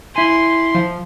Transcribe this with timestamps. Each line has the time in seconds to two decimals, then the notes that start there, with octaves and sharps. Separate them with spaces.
0.16 E4 G#5 C6
0.75 F3